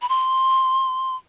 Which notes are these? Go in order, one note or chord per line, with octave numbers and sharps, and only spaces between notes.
B5
C6